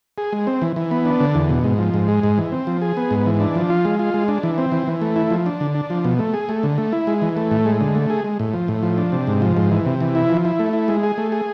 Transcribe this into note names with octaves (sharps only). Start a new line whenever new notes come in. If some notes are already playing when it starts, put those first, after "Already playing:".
G#4
G#3
C4
E3
E3
B3
D4
D3
E2
B2
G#2
F3
G#2
G#3
G#2
E3
C4
F3
G#4
B3
G#2
E3
D4
F3
F4
G#3
F4
G#3
D4
E3
C4
E3
E3
A3
E4
F3
D4
D3
D4
F3
B2
A3
G#4
A3
D3
A3
E4
G#3
E3
A3
A2
G#3
D3
A3
G#4
G#3
A2
F3
A2
F3
D4
C3
G#2
F3
G#2
E3
C3
E3
E4
F3
E4
A3
E4
G#3
G#4
A3
G#4